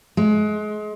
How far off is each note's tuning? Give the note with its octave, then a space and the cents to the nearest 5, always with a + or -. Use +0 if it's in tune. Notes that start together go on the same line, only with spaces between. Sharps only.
G#3 +30